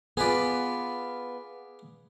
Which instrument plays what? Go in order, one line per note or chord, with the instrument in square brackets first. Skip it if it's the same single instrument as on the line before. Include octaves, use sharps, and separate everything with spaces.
[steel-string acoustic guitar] B3 F4 [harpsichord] G#4 B4 D5